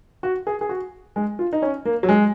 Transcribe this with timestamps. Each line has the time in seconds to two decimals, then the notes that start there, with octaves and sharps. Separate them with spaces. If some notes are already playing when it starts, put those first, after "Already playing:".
0.23 F#4
0.47 G#4
0.61 G#4
0.69 F#4
1.16 G#3
1.39 F4
1.53 D#4
1.62 C#4
1.85 A#3
2.03 F#3
2.09 G#3